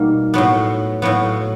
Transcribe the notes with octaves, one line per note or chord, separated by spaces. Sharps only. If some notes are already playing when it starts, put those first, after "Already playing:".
Already playing: B2 G3 A#3 D#4
A2 F#3 B3
A2 F#3 B3